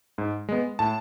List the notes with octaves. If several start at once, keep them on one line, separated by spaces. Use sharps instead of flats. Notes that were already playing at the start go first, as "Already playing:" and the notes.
G#2
G#3 B3
A2 A5